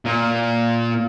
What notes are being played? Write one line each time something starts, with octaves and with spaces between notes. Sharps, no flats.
A#2